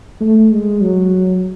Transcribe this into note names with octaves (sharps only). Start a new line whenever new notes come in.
A3
G#3
F#3